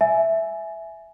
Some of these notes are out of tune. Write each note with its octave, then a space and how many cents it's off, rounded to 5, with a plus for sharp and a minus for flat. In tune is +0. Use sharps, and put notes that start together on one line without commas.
E5 +0 G#5 +15